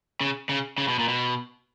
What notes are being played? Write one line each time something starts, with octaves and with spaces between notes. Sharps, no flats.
C#3
C#3
C#3
B2
A#2
B2